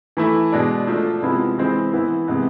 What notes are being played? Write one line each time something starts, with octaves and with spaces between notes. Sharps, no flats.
E3 A3 E4
B2 G#3 D4
F3 A3 D4
C3 F3 G#3 B3 E4
E3 G#3 C4 E4
E3 B3 E4
C3 G#3 B3